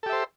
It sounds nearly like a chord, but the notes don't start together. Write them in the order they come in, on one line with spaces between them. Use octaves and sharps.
A4 G4 E5 C5